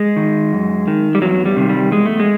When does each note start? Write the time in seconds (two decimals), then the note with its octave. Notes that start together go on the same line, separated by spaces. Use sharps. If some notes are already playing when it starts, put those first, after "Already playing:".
Already playing: G#3
0.16 D#3
0.53 F#2
0.87 D#3
1.15 G3
1.22 E2 F#3
1.46 G3
1.57 C3 D#3
1.69 G3
1.92 E2 G#3
2.06 A3
2.20 G#3